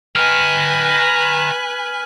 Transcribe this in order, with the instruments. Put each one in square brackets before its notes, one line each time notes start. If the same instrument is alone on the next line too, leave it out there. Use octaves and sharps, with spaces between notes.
[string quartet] B4 G#5 F#6 [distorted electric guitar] G5 A#5 [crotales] F6